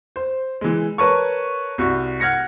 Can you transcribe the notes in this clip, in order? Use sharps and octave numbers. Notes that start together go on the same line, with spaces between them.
C5
E3 G#3
A#4 B4 C#5 A5 C#6
C2 F#4 C#6
F#5 F6 G#6 A#6 C#7